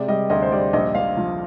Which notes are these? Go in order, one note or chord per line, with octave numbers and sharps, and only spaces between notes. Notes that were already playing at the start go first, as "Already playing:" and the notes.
Already playing: C3 G#3 D5
G3 D#5
D2 D#5
C5
G3 D5
A#1 D#5
A#1 F5
F3